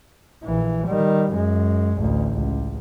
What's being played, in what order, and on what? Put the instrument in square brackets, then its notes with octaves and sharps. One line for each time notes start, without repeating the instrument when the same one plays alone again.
[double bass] A#1 E3
D#3 G3
F#2 G#3
A1 D2
C#2